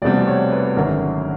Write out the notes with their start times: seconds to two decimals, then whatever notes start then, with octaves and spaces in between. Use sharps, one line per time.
0.02 F1 E2 B2 G3 C4 D5
0.27 C#5
0.52 B4
0.76 G#1 F#2 D3 A#4